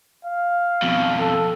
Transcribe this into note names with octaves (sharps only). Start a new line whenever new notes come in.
F5
F2 B2
A4